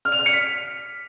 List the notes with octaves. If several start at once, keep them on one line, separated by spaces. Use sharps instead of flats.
F6
F7
F6
C#7
B6